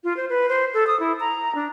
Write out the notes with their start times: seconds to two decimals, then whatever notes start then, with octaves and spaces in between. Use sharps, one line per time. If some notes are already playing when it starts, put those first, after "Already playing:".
0.04 F4
0.17 C5
0.29 B4
0.49 C5
0.74 A4
0.87 D#6
1.00 E4
1.20 A#5
1.55 D4